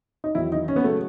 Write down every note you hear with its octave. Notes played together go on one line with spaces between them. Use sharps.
D#4
E2 D#3 F#3 E4
D#4
C#4
B3
C#3 F#3 A3